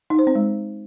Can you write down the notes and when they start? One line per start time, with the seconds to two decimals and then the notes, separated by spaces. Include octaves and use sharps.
0.10 D#4
0.19 C5
0.27 C4
0.35 G#3